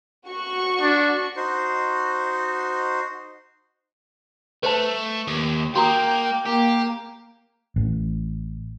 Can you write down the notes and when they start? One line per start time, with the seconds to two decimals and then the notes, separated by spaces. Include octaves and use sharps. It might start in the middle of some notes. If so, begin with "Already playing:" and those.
0.28 F#4 C#6
0.81 D4
1.37 D#4 F#4 C5
4.63 A3 B4 C5 A5
5.28 D#2
5.76 A#3 F#4 G5 A#5 D#6
6.46 A#3 G4
7.76 A1